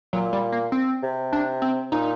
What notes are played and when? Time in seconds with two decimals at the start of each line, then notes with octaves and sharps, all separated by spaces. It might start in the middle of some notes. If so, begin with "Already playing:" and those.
0.13 A#2 F#3
0.33 G3
0.52 A#3
0.72 C4
1.02 C3
1.33 D4
1.62 C4
1.92 A#2 D#4